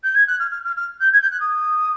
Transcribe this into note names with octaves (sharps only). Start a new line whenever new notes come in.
G6
G#6
F#6
F6
F6
F6
F6
G6
G#6
G6
F#6
D#6